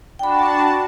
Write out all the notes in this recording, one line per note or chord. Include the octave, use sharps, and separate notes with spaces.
D4 F#4 G5 A5 B5